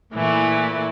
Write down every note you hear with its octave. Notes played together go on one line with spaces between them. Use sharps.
A#2 E3 A3 E4